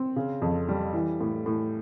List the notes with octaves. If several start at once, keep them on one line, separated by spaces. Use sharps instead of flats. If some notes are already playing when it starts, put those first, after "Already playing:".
Already playing: C4
C#3
F2
G3
E3
A2
A2